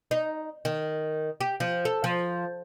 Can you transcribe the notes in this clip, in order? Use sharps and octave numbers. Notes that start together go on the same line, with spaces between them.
D#4
D#3
G4
F3
A4
F3